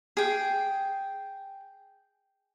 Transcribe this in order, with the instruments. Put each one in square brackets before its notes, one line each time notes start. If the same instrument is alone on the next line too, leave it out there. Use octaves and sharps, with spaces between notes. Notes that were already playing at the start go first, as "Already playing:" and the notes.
[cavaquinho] G#4 G5